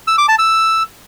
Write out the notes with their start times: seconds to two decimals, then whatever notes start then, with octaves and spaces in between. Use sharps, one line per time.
0.07 E6
0.18 D6
0.28 A5
0.39 E6